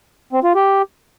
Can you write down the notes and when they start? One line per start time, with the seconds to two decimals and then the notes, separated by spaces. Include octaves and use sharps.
0.33 C4
0.44 F4
0.55 G4